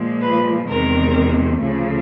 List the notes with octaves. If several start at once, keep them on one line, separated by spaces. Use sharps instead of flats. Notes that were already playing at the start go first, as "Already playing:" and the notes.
Already playing: A#2 F3 G#3
B4
E2 C3 D#3 G#3 A#4
D2 C#3 F3 A3